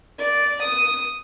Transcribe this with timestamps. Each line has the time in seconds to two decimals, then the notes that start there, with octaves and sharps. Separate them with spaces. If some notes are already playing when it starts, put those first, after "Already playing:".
0.18 D5
0.61 D#6